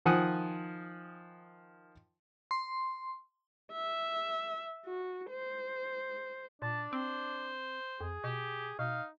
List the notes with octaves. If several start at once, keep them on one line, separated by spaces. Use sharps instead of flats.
D#3 F3 F#5 G#5 D#6 F#6
C6
E5
F#4
C5
A#2 D4 A5
C4 C5
F2 G#4
B2 G4
B2 D#4 F5